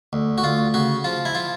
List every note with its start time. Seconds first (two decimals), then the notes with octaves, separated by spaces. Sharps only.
0.13 D2
0.38 F#4
0.43 D2 F4
0.74 C#3 F#4
1.04 F3 F4
1.25 E4
1.35 F3 F4